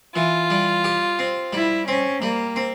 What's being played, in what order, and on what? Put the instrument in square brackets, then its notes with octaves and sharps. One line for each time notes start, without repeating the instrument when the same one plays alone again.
[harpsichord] E3 [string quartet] F4
[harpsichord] G3
G4
C4
[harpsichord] G3 [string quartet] E4
[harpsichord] C4 [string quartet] C#4
[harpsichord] G3 [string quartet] A#3
[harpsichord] C4